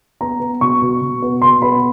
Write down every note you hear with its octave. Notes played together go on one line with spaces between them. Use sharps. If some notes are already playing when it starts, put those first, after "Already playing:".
B3 A#5
B3
B2 C#6
B2
B2
B3
B2 C6
B3 B5